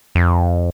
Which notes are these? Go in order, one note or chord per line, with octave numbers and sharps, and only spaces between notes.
F2